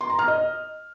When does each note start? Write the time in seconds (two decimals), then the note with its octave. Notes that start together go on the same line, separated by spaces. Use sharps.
0.01 C6
0.10 A#5
0.19 F6
0.28 D#5